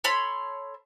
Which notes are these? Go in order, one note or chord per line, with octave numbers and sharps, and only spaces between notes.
A4 C#5 B5 C6